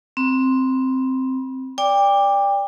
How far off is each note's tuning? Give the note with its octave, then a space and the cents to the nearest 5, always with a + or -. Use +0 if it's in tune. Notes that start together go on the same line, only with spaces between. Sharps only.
C4 -5 B5 -30
D5 -10 G5 +30 D6 +0